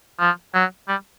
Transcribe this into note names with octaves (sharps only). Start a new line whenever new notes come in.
F3
F#3
G3